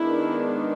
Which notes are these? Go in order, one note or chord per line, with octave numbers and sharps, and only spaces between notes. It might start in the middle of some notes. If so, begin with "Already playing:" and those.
Already playing: D#3 G#3 B3 D4 E4